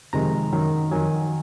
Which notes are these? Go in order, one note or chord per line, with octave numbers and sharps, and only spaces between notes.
F2 C3 D#3 G#3 A#5
F#2 D#3 F#3
F2 D#3 F#3 G#5